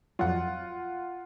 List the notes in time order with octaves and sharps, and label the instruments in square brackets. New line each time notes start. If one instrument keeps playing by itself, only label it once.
[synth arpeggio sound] F2 F#3 [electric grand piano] F4 F#5